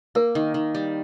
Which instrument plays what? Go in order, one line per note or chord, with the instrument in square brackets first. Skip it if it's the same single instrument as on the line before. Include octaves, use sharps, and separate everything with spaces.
[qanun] A#3 [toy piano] A#4
[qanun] D#3
D#3
G3